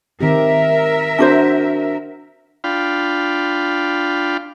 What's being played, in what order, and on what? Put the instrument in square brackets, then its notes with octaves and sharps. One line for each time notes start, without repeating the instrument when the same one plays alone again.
[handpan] D#3 C4 G4 [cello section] A#4 E5
[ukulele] D4 F#4 C5
[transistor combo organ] D4 F4 F5 G5 B5